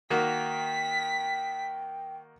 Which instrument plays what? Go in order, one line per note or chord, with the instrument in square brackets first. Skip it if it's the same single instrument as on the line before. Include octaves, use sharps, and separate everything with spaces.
[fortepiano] D#3 A#3 F#4 [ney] G5 [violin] B6